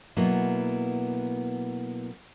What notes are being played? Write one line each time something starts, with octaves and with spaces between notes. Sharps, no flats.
B2 F#3 A#3 B3 E4